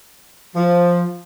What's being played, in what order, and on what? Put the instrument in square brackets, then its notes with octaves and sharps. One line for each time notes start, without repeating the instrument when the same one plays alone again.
[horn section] F3